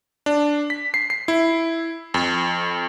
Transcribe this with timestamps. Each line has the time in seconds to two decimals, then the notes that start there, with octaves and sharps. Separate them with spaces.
0.26 D4
0.70 B6
0.94 C7
1.10 C7
1.28 E4
2.14 F2